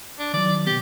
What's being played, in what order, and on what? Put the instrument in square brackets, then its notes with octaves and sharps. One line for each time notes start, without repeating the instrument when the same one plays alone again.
[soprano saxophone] D4
[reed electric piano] D#3 F#3 [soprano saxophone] D5
[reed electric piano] B2 B3 [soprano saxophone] G4